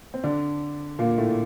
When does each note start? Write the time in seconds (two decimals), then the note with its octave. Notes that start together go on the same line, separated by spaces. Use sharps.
0.14 C4
0.24 D3 D4
0.99 A#2 A#3
1.18 A2 A3